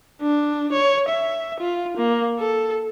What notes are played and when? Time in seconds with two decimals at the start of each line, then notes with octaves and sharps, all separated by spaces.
0.22 D4
0.72 C#5
1.09 E5
1.60 F4
1.97 A#3
2.40 A4